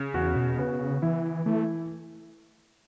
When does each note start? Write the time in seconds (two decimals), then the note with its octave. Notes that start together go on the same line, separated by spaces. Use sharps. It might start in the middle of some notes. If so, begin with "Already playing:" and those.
Already playing: C#3
0.14 E2 F#4
0.36 B2
0.58 C#3 B3
1.02 E3 E4
1.46 E3 A3